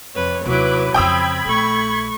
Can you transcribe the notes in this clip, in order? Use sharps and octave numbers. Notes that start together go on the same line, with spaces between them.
F2 C3 B4 C#5
D#2 C3 F#3 E4 B4 D6
F2 C#3 C4 G5 B5 D#6 E6 G#6
A#1 A3 C#6